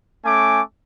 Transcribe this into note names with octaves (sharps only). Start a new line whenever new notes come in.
A3 C#4 G#5 D6